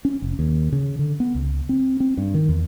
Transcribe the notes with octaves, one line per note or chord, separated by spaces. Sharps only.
C#4
F1
D#2
C#3
D3
B3
C#2
C4
C4
G2
D#3
E2